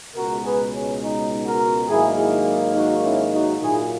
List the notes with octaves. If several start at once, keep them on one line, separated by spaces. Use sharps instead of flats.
C#2 B2 G#3 F#4 A#4
G#4 B4
C#4
D#4
F#4 A#4
G#2 D#3 F#3 A#3 E4 G#4
E4 G#4
D#4 F#4
C#4 E4
D#4 F#4
A#2 F#3 A#3 E4 G#4